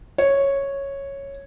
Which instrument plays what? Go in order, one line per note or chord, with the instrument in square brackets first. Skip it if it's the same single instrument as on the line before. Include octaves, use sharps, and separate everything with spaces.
[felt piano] C#5